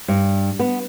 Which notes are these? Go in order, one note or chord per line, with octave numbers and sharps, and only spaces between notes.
G2
B3